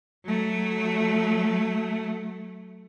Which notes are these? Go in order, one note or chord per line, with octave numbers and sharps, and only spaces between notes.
F#3 A3